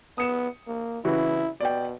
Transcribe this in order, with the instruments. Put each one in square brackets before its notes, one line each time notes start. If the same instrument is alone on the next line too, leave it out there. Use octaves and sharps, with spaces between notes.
[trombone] B3 [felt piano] D#6 C#7 E7
[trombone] A#3
[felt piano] C#3 E3 F#4 [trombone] E4
[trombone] B2 [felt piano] D5 G5